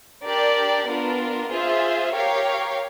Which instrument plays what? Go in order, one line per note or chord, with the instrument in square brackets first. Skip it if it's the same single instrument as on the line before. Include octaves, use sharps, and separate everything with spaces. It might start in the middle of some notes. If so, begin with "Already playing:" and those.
[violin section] D4 G4 A#4 D5
B3 D4 F4 A#4
F4 G#4 C5 E5
G4 A#4 C#5 F5